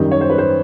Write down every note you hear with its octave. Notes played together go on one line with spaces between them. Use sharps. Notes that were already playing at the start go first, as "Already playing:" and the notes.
Already playing: F#2 D#3 G3
C#5
C5
B4
C5